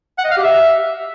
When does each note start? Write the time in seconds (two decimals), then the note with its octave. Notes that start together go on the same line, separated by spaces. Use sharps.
0.18 F#5
0.25 D#5
0.31 F5
0.37 G4
0.43 E5